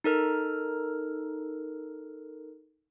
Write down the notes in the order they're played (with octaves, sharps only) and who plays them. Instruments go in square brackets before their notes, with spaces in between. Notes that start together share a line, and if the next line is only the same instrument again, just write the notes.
[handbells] D#4 A4 A#4 F6